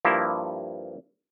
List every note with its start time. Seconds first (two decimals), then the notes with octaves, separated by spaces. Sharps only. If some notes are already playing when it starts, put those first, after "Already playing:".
0.05 G2 F3 A#3 E4